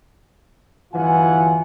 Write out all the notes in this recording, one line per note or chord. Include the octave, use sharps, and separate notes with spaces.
G1 E3 F#3 F4 F#5 G#5